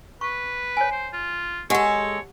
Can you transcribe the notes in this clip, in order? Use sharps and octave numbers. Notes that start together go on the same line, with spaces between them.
B4 C#6
C#5 G#5
C5
F4
G#3 G4 A4 C#5 F#5